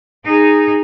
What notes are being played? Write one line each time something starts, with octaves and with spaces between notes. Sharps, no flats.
D#4 G#4